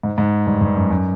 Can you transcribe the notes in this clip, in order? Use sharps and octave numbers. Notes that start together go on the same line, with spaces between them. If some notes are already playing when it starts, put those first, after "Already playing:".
G#2
G#2
G2
G2
F#2
F#2